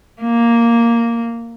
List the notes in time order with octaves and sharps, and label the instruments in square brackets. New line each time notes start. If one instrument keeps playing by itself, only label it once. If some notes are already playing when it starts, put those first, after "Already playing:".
[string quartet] A#3